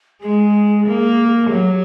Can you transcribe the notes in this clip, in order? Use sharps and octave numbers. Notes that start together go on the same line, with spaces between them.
G#3 G#4
A#3
F#3 G4